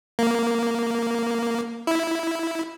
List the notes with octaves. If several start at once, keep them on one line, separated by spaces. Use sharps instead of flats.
A#3
E4